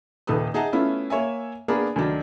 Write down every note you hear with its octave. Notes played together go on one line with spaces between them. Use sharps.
D#1 D#3 A4 B4 D#6
D#4 G#4 E5 F#5 A5 A#5
A3 B3 C#4 E4 F4
A#3 C#5 E5 G#5
A#3 B3 D4 G#4 A#4
D2 D#3 F#3 D4